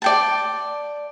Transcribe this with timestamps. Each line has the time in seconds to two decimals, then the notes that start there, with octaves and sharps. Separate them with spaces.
0.02 D5 G5 A5